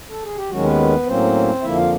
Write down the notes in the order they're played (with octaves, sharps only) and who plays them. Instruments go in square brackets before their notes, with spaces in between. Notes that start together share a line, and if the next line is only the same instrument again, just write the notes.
[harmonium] A4
G#4
G4
D#2 D#3 F#3 G#3 C#4 F#4
B3 B4
A2 F#3 A#3 C4 C#4 C5
F2 D3 F3 A#3 E4 E5
F4 F5